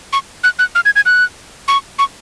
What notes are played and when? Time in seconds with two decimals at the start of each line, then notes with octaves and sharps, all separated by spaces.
0.13 C#6
0.44 F#6
0.59 F#6
0.75 F6
0.85 G#6
0.96 G#6
1.06 F#6
1.68 C#6
1.99 C#6